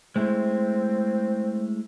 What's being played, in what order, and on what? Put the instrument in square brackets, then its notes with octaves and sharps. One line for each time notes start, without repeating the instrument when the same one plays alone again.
[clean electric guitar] G#3 A3 E4 [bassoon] C4